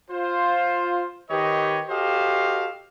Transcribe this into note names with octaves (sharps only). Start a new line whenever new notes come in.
F4 C5
D#3 G4 B4 C#5 D#5
F#4 G4 A4 C5 D#5 F5